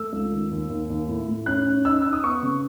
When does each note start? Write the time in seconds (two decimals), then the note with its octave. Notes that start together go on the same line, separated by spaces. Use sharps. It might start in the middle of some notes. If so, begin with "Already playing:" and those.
Already playing: A3 E6
0.13 C#2
0.32 D#3
0.51 D#2
0.70 D#2
0.90 D#2
1.08 A2
1.28 A2
1.46 C#4 F#6
1.66 C#4
1.85 D#4 E6
2.02 D#4 E6
2.13 D#6
2.23 B3 C#6
2.43 C#3